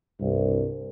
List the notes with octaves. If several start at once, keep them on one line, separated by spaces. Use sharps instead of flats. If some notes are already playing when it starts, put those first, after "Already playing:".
C2 G2